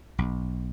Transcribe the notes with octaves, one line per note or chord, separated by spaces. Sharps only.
B1